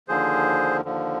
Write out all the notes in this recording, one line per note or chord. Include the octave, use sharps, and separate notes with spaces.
D#2 D3 F3 G#4 C5
D#2 D3 F3